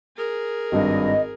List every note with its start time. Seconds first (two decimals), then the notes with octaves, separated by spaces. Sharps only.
0.17 G#4 A#4
0.72 G#1 G2 D#5